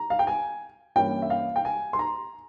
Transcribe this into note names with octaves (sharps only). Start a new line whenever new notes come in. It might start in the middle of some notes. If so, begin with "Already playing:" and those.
Already playing: A#5
F5
G5
G#5
G2 E3 A#3 C#4 E4 G5
E5
F5
G5
G#5
C6
A#5